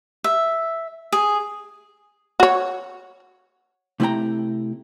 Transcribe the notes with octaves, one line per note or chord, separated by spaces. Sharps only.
E5
G#4
F#4 C#5
C3 A3 E4 C5 G5 A#5